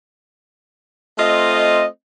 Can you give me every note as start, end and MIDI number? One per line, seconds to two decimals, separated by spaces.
1.19 1.86 57
1.19 1.86 60
1.19 1.86 65
1.19 1.86 75